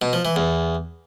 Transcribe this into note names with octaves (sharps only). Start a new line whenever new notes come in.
B2
F3
E3
E2